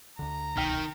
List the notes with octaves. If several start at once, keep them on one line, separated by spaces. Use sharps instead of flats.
D2 D3 A#5
D1 C2 B2 D#3 G5 F6 B6